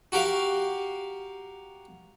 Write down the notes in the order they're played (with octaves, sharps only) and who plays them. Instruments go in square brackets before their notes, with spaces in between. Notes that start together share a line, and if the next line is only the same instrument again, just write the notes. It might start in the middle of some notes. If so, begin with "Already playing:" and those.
[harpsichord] F#4 G4 A#4 F5